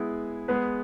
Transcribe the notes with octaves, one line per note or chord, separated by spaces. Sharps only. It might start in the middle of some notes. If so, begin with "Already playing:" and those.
Already playing: G#3 B3 E4 G#4
G#3 B3 G#4 B4